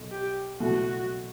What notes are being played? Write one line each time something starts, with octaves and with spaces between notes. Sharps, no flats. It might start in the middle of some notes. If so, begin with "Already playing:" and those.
Already playing: B1
G4
B1 B2 A3 F#4